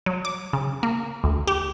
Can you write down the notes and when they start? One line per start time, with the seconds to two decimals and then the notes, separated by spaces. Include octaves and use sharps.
0.06 F#3
0.25 D6
0.53 C#3
0.83 A#3
1.24 D2
1.47 G4